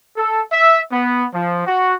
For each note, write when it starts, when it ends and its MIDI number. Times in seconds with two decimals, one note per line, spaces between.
0.17 0.41 69
0.51 0.81 76
0.91 1.25 59
1.33 1.66 53
1.66 1.95 66